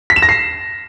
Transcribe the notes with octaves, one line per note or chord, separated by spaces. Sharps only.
B6
E7
A#6
C7